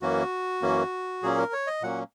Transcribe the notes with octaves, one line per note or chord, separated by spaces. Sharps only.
F#2 E3 A#3 C#4 F#4
F#2 E3 A#3 C#4
A#2 F#3 A#3 C#4 G#4
A#4
C#5
D#5
A#2 F#3 A#3 C#4 F#5